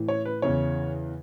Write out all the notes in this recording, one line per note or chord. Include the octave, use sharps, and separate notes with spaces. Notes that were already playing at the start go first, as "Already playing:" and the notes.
Already playing: A2 E3
C#5
B4
E2 C#3 E3 C#5